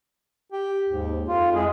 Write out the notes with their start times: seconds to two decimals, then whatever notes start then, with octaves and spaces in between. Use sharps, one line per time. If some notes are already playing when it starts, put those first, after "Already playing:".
0.52 G4
0.89 D#2 G#2
1.28 F2 F4
1.55 G#3 E4 G#4